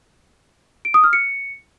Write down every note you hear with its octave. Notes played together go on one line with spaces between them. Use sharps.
D7
D#6
F6
C#7